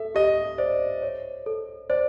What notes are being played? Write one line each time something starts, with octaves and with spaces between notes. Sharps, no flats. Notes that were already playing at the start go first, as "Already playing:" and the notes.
Already playing: A4 E5
G4 D#5
C5 D5
C#5
A4
C5 D5